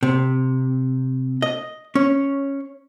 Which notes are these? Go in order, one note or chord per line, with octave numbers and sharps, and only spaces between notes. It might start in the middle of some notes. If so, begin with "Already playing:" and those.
C3
D#5
C#4